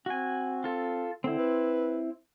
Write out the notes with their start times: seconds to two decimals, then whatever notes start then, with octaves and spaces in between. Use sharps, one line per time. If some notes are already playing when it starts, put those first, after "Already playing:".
0.06 C4 F#4 G#5
0.64 F4 A4
1.24 D3 C4 E4
1.38 B4